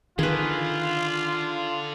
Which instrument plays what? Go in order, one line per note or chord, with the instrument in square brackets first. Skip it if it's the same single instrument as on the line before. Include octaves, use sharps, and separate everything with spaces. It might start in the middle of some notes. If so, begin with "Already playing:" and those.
[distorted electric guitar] D3 [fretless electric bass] D#3 [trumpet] F4 [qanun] G#4 B4